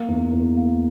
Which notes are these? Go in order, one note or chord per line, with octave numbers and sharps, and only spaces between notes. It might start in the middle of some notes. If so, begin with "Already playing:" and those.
Already playing: A#3
E2
E2
A#3